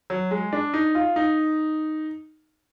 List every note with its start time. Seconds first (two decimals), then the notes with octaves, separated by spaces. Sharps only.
0.10 F#3
0.31 G#3
0.53 D4
0.74 D#4
0.95 F4
1.16 D#4